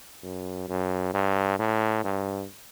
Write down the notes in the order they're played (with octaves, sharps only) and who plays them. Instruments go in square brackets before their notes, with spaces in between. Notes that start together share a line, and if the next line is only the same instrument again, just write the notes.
[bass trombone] F#2
F#2
G2
A2
G2